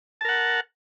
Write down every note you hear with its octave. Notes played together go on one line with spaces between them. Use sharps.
A#4 F#5 A5